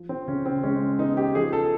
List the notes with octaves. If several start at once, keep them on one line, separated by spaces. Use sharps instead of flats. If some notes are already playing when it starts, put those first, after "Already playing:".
Already playing: F3
C4
C#3 C#4
C4
G#3 C#4
B3 D#4
G4
F3 G#4
A4